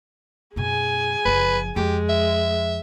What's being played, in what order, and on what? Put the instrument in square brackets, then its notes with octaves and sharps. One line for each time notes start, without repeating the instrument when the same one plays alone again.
[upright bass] F#2 B2 [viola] G#4 G#5
[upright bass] F#1 F3 [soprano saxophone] B4
[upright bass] F2 [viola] G#3 [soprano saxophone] G4
[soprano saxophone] E5